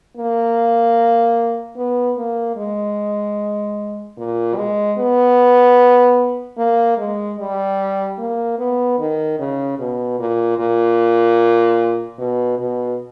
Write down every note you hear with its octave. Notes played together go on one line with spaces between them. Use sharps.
A#3
B3
A#3
G#3
A#2
G#3
B3
A#3
G#3
G3
A#3
B3
D#3
C#3
B2
A#2
A#2
B2
B2